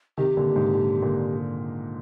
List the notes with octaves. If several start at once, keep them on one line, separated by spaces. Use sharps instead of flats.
C3 D#3 G4
A#2 D3
A#2
G#2 C3
A#2 D3
A#2 D3